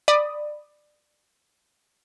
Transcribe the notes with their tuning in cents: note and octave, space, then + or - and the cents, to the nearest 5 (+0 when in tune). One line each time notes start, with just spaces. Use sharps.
D5 +20 B5 +0 D#6 +0